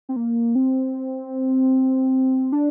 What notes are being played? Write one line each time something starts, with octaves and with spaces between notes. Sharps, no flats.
C4
A#3
C4
D4